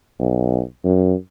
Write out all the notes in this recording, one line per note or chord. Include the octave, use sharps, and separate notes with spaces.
B1
F#2